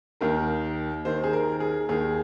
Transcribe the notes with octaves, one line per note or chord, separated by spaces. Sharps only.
D#2 D#3 A#4
D#2 D#3 C5
G#4
A#4
G#4
D#2 D#3 G#4